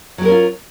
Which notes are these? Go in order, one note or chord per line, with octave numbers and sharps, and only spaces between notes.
F#3 C#4 F4 G4 A#4